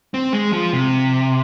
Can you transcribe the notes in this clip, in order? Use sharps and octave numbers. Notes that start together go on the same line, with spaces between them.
C4
G#3
F3
C3